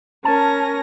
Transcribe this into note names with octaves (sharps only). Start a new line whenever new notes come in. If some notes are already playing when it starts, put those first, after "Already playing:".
C#4 A#4 A5 A#6